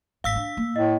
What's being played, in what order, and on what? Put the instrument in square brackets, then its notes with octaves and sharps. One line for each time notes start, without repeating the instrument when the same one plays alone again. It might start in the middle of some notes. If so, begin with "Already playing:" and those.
[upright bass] G#1 [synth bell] F5 E6 B6
[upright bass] D4
A#3
[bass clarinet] A2 [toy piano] D#5